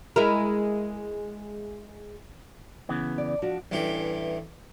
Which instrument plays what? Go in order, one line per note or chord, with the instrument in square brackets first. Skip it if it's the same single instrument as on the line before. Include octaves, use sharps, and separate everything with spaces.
[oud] G#3 E4 A#4
[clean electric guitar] C#3 E3 B3
[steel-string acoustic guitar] D5
F3 D4 F#4
[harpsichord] A1 G2 E3 G4